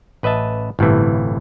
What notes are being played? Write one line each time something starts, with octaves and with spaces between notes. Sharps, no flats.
A1 B4 D#5 E5 A5
G1 A2 C3 E3